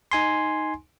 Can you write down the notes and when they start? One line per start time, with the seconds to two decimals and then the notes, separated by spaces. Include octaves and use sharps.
0.12 D#4 G#5 C6